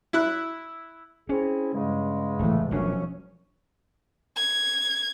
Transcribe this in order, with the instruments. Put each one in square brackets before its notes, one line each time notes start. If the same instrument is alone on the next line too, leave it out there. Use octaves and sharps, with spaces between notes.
[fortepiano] E4 E6 F#6
[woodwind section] C4 E4 G#4 [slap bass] C#4
[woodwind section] E2 C#3 G#3 [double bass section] G2
[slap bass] D#1 E3 [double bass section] A2 A3
[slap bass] E1 F#3 D4 [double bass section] F#2 F3 C#4
[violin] G#6